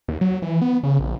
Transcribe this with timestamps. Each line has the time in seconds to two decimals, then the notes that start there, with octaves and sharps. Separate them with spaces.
0.08 D#2
0.21 F#3
0.42 E3
0.62 B3
0.83 C#3
1.00 A#1